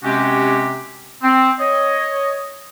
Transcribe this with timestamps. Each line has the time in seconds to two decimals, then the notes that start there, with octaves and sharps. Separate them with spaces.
0.04 C3 G#3 C4 C#4 F#4 G4
1.22 C4
1.60 C#5 D#5